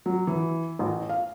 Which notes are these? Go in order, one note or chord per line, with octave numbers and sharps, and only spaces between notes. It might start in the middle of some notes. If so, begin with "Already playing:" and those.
F#3
E3
A1
F5